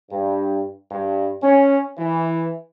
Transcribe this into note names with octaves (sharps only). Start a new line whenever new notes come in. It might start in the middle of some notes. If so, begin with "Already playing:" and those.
G2
G2
C#4
E3